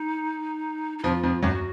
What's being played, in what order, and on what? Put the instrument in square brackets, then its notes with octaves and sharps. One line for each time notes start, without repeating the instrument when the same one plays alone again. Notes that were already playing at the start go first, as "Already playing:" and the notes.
Already playing: [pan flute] D#4
D#4
[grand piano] F2 F3 [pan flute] F4
[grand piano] F2 F3
[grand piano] F#2 F#3 [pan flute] F#4